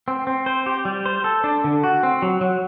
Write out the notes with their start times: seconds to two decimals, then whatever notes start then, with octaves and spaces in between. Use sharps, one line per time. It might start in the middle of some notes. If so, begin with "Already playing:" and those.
0.08 C4
0.27 C4
0.46 C5
0.66 G4
0.85 G3
1.06 C5
1.24 A4
1.44 D4
1.64 D3
1.84 F#4
2.03 C4
2.22 F#3
2.41 F#3